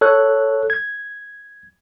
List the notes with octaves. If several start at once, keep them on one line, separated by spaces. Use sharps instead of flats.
A4 C#5 F#6
G#6